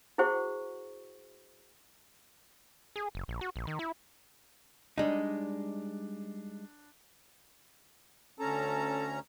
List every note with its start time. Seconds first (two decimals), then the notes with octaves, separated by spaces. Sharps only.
0.18 E4 F#4 G#4 C5 F#5 C#6
2.96 G#4
3.15 F#1
3.28 A#1
3.41 F#4
3.56 A#1
3.67 D#3
3.79 E4
4.98 G3 G#3 D4 D#4
8.40 D2 C#4 A4 A#5